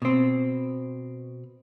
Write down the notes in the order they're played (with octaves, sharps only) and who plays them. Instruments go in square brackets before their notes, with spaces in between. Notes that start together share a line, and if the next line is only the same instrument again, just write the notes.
[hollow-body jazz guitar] B2 C4